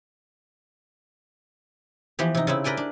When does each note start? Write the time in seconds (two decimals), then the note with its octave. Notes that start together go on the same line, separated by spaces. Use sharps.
2.19 E3 F3 B3 G4
2.35 C3 D#4
2.47 C#3 C4 E4
2.64 A#4 B4 D5 G5 G#5
2.77 D4